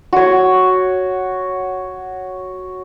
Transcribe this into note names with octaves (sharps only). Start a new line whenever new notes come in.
F#4 C#5